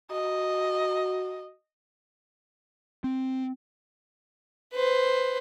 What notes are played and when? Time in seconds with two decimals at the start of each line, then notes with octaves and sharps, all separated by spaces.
0.11 F#4 D#5
3.04 C4
4.74 B4 C5